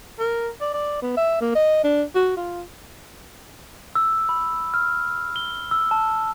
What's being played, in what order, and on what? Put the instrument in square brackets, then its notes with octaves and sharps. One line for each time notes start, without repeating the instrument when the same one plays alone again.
[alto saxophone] A#4
D5
D5
B3
E5
A#3
D#5
D4
F#4
F4
[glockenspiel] E6
B5
F6
G7
E6
A5